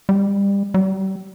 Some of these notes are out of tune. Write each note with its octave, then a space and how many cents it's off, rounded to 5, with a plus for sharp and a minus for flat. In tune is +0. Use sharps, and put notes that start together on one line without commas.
G3 +25
G3 -35